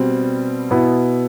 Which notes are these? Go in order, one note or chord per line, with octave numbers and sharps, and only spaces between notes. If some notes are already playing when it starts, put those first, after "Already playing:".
Already playing: B2 G3 C4
B2 B3 E4